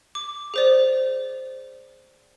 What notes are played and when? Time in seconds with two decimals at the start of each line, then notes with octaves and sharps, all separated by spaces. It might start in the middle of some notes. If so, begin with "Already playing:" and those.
0.15 D6
0.54 G#4 C5 D5